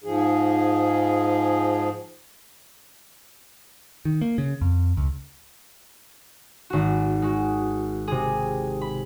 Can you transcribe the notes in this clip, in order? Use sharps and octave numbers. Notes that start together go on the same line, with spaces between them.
G#2 F3 G#4
D#3
A#3
C#3
F2
C#2
G#1 F#4
G#3 F#4
C3 G#4
B5